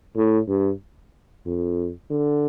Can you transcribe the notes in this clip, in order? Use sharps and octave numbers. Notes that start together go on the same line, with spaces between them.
A2
G2
F2
D3